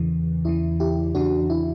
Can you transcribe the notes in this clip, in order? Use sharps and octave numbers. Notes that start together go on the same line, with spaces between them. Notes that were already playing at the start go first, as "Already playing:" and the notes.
Already playing: E2 C#3 E3
E2 C#3 E3 E4
E4 G4
E2 C#3 E3 D4 F#4
E4